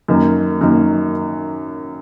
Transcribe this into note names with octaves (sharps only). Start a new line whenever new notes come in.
F#2 D#3 A#3
F#2 D#3 A#3